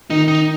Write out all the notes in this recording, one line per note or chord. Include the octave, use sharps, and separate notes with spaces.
D#3 D#4
D#4